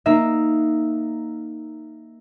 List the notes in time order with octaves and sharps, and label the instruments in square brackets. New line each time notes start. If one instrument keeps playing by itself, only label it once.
[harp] A#3 D#4 E5